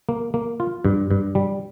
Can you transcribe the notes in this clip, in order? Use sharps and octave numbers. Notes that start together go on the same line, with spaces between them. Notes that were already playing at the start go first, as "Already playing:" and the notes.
A#3
A#3
F4
G2
G2
G3